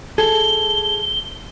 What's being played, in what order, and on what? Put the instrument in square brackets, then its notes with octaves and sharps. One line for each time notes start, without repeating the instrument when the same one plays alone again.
[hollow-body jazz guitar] G#4 A4 [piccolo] G7